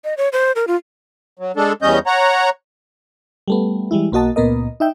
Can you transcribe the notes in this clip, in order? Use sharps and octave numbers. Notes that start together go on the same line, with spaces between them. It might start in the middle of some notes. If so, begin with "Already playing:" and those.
D#5
C#5
C5
A#4
F4
F#3
G#3 D4 A4
E2 G3 C#4 D#5 G6
C#5 F#5 A#5
G3 A3 B3
E3 G3 G#3 E4
B1 A#3 F#4 D#5 A5
C#2 A#2 B3 A#4 D#5
D#4 E5 G5